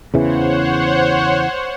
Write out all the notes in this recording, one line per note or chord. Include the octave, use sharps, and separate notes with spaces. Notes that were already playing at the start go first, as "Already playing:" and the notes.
E2 C#3 E3 C5 C#5 F#5